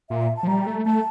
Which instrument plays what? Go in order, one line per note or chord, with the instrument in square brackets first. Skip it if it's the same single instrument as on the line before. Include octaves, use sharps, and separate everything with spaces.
[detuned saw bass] A#2 [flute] E5
[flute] A5
[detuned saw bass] F3
[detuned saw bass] G3 [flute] A#5
[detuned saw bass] A3
[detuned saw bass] A3 [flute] A5